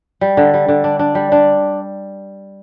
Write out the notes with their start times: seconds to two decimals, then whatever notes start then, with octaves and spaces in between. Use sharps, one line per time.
0.21 G3
0.37 D3
0.54 G3
0.68 D3
0.84 D4
0.99 D4
1.15 G3
1.32 D4